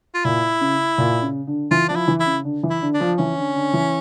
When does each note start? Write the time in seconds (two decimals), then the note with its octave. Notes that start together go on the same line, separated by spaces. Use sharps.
0.14 F4
0.24 A#2 E4
0.61 C#3
0.98 A#2
1.22 C#3
1.47 D3
1.71 E3 F4
1.88 F3 D4
1.96 E4
2.08 E3
2.20 E4
2.26 C#3
2.44 D3
2.63 E3
2.70 E4
2.82 D3
2.94 D4
3.00 F3
3.18 E3 C#4
3.37 D3
3.55 D3
3.73 E3